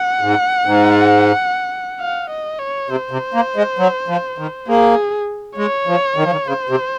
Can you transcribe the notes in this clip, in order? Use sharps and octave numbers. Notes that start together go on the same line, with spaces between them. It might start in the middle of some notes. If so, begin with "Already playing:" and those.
Already playing: F#5
G#2
G#2
F5
D#5
C#5
C3 C5
C3
A#3
G#3
F#3
F3
D#3
A#3 G#4
G#3 C#5
F3
D#3
F3
D#3
C#3 C5
C3